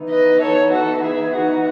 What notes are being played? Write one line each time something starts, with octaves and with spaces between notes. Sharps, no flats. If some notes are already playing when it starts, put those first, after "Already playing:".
Already playing: E3 B3 D#4
B4 D#5
A4 C#5
F#4 A4
E4 G#4
D#4 F#4